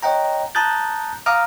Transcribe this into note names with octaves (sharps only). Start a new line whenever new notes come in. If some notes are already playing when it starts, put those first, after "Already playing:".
C#5 D#5 F#5 G5 A#5
A5 A#5 D#6 F#6 G6 A6
F5 F#5 A#5 D6 D#6 F6